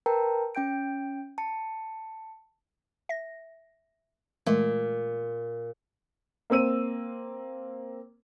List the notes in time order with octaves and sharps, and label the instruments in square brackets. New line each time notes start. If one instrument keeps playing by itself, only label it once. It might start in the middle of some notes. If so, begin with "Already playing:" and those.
[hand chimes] A#4 B4 G5 A5 A#5
C#4 G5 G6 D7
A5 C#7
[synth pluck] E5 A#6
[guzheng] A#2 [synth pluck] E3 G#3 A3
[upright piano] A#3 C4 E6 D#7